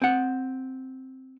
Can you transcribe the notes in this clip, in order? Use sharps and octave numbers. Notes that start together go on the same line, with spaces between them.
C4 F#5